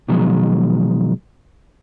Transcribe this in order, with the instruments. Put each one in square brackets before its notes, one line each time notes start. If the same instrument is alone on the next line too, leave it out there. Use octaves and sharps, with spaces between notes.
[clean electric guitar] B2 D#3 F3 F#3 G#3